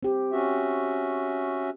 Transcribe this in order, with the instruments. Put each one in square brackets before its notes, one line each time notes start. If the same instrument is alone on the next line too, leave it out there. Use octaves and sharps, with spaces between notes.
[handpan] C4 G4
[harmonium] C#4 F#4 E5